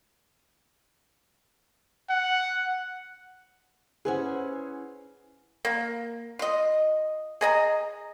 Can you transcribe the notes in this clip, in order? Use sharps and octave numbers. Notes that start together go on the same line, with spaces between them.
F#5
C#4 E4 G#4 B4 C5 F#5
A#3
F4 D#5
G#4 D#5 A#5